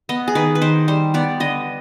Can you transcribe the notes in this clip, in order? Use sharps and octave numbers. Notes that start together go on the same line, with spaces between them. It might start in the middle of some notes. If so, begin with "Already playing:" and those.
B3 D#5
G#4
D#3 B4
B4
D#3 C5
G3 C5
B3 D5
D3 D#5